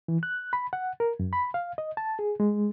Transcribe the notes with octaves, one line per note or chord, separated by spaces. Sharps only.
E3
F#6
B5
F#5
A#4
F#2
B5
F5
D#5
A5
G#4
G#3